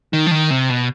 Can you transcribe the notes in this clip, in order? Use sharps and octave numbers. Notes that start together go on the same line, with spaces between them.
D#3
F3
D#3
C3
B2